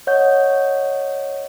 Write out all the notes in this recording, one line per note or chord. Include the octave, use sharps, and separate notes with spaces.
C#5 D#5 F#5 G6